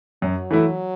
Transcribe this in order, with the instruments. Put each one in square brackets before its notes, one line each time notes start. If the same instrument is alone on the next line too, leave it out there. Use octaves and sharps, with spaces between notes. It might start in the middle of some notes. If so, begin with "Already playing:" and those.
[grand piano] F#2 [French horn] F#3
[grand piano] E3 A3 E4